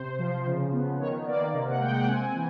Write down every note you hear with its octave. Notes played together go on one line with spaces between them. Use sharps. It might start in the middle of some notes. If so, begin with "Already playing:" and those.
Already playing: C3 C5
F3
C#3
B3
D#3 C#5
A#3 D5
C3 D#5
F#5
G#3 G5
F#5
C4 G#5
E3